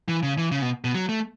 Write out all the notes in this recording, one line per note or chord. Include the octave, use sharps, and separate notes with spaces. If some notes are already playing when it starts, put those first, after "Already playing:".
E3
C#3
E3
C#3
B2
B2
F#3
A3